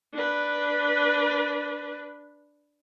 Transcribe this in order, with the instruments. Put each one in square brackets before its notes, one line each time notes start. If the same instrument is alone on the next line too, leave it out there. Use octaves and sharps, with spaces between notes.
[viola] D4 B4